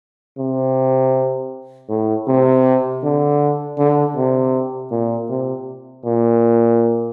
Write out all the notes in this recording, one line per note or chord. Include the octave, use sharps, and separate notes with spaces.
C3
A2
C3
D3
D3
C3
A#2
C3
A#2